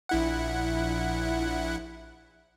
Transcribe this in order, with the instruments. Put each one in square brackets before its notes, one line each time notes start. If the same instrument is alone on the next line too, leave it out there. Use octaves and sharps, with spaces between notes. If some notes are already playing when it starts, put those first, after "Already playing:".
[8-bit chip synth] A#1 E4 F#5